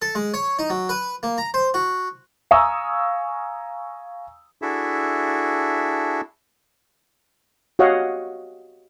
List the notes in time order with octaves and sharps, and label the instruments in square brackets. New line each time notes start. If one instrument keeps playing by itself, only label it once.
[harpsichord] A4
G#3
C#5
D#4
F#3
B4
A#3
A#5
C5
F#4
[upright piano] F5 G#5 A#5 C#6 D#6 E6
[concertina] D4 E4 F#4 G#4 A4 E5
[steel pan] F#4 G4 C#5 D#5 F5 F#5